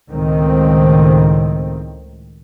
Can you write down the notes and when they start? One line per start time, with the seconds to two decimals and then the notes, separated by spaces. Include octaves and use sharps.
0.11 C#2 A2 D#3 C4